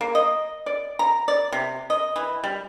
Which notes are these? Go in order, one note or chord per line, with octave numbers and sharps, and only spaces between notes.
A#3
D#5
D5
A#5
D5
C3
D#5
E3
G3